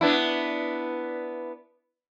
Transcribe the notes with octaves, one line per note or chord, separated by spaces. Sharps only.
B3 D4 E4